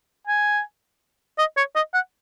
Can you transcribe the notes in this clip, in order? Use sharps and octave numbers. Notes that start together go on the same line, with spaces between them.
G#5
D#5
C#5
D#5
F#5